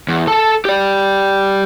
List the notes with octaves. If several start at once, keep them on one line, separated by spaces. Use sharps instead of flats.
E2
A4 A5
G4 D5